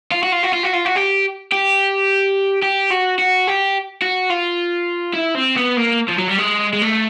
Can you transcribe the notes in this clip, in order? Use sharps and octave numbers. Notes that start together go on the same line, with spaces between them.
F4
F#4
F4
F#4
F4
F#4
F4
F#4
G4
G4
G4
F#4
F#4
G4
F#4
F4
E4
C4
B3
A#3
F3
F#3
G3
G#3
G#3
A3